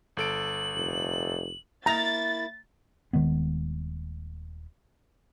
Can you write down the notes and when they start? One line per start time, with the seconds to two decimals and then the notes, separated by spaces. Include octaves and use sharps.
0.17 G1 A4 D7 F#7
0.75 F1
1.86 A#3 E4 A#5 A6
3.13 D#1 D#3 G#3 B3